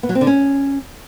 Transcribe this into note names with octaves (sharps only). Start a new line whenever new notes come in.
B3
F#3
C4
D3
C#4